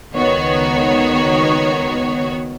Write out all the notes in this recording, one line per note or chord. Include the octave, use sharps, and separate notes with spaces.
C#2 D#3 B3 F#4 C#5